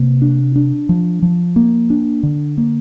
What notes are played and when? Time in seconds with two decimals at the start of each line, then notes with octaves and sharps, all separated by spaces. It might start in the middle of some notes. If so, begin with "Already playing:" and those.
Already playing: C3 A#3
0.22 D4
0.56 D4
0.89 F3
1.22 F3
1.56 A#3
1.90 D4
2.23 D3
2.58 A#3